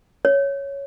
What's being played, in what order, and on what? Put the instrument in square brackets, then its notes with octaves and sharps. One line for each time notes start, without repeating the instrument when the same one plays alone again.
[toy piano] C#5